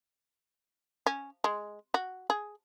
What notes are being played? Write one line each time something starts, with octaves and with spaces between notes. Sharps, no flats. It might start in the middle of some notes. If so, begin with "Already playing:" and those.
C#4
G#3
F#4
G#4